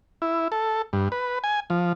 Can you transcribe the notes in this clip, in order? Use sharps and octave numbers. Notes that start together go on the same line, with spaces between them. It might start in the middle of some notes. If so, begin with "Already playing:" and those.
E4
A4
G2
B4
G#5
F3